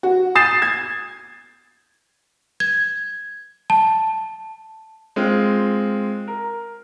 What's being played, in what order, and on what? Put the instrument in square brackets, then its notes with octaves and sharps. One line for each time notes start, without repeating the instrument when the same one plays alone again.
[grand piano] F#4
D#6 G6 A6 C7 E7
G#6
[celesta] G#6
A5
[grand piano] G#3 C4 F4
A#4